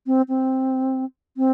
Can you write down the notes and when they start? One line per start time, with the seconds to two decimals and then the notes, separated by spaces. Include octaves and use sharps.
0.07 C4
0.29 C4
1.37 C4